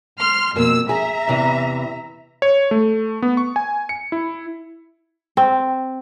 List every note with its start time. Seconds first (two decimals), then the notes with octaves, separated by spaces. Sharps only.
0.19 C6 F6
0.56 F2 B2 A#3 E6
0.89 G#4 E5 A#5
1.28 E2 C3 E3
2.42 C#5
2.71 A3
3.22 B3
3.37 C#6
3.56 G#5
3.89 C#7
4.12 E4
5.37 C4